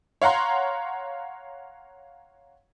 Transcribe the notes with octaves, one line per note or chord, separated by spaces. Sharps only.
C#5 F5 F#5 A#5 C6